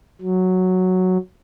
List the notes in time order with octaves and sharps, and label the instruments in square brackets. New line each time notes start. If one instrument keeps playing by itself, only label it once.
[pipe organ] F#3